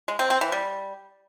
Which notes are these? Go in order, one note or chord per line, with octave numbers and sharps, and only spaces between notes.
G#3
C4
C4
E3
G3